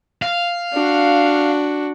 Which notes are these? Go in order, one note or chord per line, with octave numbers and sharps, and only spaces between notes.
F5
D4 F#4